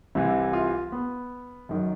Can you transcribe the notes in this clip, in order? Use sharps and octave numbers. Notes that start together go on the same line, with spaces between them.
C2 C3 E3 E4
F4
B3
F#2 D#3 F#3